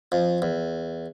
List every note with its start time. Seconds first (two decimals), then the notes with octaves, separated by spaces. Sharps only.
0.12 F2
0.42 E2